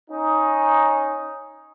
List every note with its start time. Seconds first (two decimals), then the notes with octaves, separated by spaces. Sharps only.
0.10 C#4 D#4